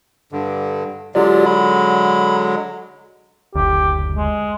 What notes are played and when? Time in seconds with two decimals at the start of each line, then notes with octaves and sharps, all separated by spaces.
0.32 G2 D3
1.15 D3 F#3 G#3 F4 G4 D5
1.46 B5
3.55 F#1 D2 G4
4.16 G#3